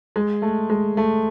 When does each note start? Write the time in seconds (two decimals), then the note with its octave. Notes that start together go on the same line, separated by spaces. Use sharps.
0.16 G#3
0.42 A3
0.70 G#3
0.97 A3